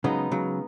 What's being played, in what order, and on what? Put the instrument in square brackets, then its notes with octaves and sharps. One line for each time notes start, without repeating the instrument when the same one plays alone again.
[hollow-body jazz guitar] C#3 F#3 [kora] G#3 B3 D#4
[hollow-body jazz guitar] C#3 F#3